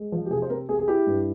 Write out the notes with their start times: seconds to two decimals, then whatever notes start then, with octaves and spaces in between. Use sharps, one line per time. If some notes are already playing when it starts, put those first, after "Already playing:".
Already playing: G#3
0.12 F3
0.26 G4
0.30 C3 G#4
0.42 C5
0.50 C4 A#4
0.69 C4 G#4
0.79 G#4
0.88 E4 G4
1.07 G2